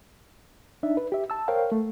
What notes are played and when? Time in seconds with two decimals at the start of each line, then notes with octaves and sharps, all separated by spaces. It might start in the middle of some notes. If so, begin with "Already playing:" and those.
0.83 D4 D#4 E5
0.97 B4
1.12 G4 E5
1.30 A5 E6
1.48 A#4 C5 C#5 F5 G5
1.72 A3